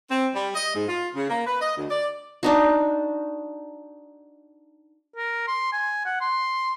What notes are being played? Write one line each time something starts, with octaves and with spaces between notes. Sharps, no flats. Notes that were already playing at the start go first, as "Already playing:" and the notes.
C4
G3
D#5
G#2
F4
C#3
A#3
B4
D#5
D2
D5
D4 D#4 F#4
A#4
C6
G#5
F#5
C6